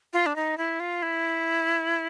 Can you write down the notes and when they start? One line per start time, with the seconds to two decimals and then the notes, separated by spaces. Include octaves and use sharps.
0.13 F4
0.26 D4
0.36 D#4
0.58 E4
0.80 F4
1.03 E4